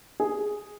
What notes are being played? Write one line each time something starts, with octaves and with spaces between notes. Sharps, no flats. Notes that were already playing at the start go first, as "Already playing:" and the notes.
G#4